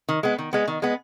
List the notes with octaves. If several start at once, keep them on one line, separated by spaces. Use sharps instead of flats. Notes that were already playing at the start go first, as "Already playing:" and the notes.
D#3
G#3 B3
D#3
G#3 B3
D#3
G#3 B3